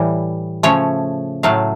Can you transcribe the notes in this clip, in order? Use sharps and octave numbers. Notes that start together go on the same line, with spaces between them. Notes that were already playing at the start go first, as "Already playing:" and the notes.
Already playing: A2 E3 G3
C#3 F3 A3 C#5
A2 F#3 A3 F5